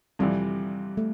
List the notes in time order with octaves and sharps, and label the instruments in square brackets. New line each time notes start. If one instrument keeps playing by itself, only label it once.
[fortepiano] F2 C3 E3 [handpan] G3
[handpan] A3